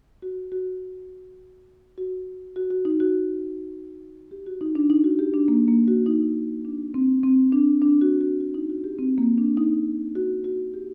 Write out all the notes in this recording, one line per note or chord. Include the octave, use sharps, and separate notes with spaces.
F#4
F#4
F#4
F#4
F#4
D#4
F#4
G4
F#4
D#4
D4
D#4
F#4
G4
D4
A#3
A#3
F#4
D#4
D4
C4
C4
D4
D4
F#4
F#4
F#4
D#4
F#4
G4
C4
A#3
D4
D#4
F#4
F#4
G4